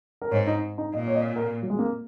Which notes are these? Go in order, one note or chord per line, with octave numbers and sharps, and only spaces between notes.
A#4
G#2 C#5
D#4
D#4
A#2 D#5
C#5
D#5
A#4
F#3
G#3
A#3